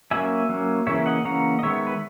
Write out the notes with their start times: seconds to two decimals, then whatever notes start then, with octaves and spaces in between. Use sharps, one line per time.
0.11 F#3 A#3 C#4 E5 G#5
0.49 F#3 A#3 C#4
0.87 C#3 E3 A#3 C#4 C#5 E5
1.06 D#5 F#5
1.25 C#3 E3 A#3 C#4 F#5 A#5
1.59 D#5
1.63 D#3 G#3 B3 C#5 E5
1.87 B4